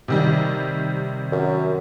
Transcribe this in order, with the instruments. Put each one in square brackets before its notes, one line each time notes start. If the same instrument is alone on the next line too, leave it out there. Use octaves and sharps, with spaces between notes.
[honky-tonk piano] C3 D#3 G3
[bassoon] F#2